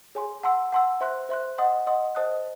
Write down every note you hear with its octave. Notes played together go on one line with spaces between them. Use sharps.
G#4 C#5 G#5 C6
F#5 A5 C6 E6
F#5 A5 C6 E6
C5 E5 C6 F#6
C5 E5 C6 F#6
D#5 F#5 C6 D#6
D#5 F#5 C6 D#6
C5 D#5 A5 D#6 F#6